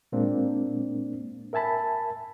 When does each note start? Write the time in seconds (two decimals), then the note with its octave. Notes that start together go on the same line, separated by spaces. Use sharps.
0.12 A#2 G#3 A#3 C4 D4
1.53 A#4 E5 G#5 A5 B5